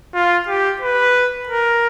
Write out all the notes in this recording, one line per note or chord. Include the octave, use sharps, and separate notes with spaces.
F4
G4
B4
A#4